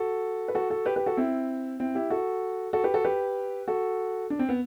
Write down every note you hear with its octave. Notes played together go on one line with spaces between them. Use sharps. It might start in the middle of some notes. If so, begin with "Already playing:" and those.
Already playing: F#4 A4
B4
F#4 A4
F#4 A4
G4 B4
G4 B4
F#4 A4
C4 E4
C4 E4
E4 G4
F#4 A4
F#4 A4
G4 B4
F#4 A4
G4 B4
F#4 A4
D4
C4
B3